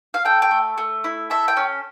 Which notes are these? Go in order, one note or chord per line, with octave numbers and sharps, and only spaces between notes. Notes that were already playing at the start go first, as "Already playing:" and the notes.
F5
A4 G5
G5
A3
A3
E4
A4 E5
G5
C#4